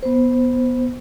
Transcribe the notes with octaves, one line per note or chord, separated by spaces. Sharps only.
B3 C5